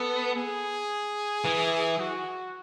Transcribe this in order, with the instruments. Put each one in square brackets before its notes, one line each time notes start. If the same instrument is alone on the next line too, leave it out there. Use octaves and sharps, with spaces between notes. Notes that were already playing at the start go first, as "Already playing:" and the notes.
Already playing: [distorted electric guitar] B3 [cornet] A4
[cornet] G#4
[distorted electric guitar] E3
[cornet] F#4